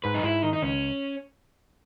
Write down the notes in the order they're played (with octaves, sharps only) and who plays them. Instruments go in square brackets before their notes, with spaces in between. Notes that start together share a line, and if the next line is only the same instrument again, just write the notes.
[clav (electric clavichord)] G#2 [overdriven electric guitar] B4
[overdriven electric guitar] D#4
[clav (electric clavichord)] G#2 [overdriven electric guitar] E4
[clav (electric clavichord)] D#3 [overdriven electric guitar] D#4
[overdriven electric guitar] D#4
[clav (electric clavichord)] C#2 [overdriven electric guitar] C#4